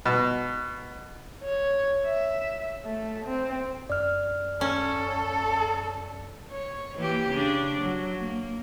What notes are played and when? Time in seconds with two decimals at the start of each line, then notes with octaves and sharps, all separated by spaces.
0.05 B2
1.44 C#5
2.06 E5
2.85 A3
3.25 C4
3.90 F#2 D5 F6
4.61 C#4 A4
6.52 C#5
6.96 E3 A#3 G4
7.30 C#3 D4
7.81 F#3
8.19 A#3